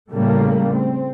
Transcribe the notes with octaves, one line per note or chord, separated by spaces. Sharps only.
A2 C#3 G3 A3 A#3
C4